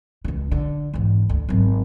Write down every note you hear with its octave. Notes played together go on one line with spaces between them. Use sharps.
C#2 C#3
D3
E2 G#2
D2
G#1 F#3